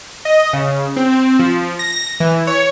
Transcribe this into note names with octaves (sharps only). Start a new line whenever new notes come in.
D#5
C#3
C4
F3
A#6
E3
C#5